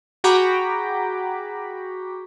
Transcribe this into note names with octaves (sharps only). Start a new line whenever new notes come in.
F#4 G#4 G5 A#5 B5 D6